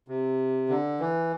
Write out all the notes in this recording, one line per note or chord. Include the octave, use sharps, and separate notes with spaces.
C3
D3
E3